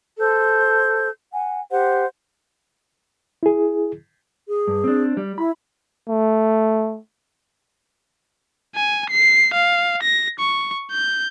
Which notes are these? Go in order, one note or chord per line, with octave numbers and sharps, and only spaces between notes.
A4 C5 G6
F#5 G#5
G4 C5 F#5
E4 G#4
G#4
G2
C4 D4
G3
E4 B5
A3
G#5
C7
F5
A#6
C#6
G6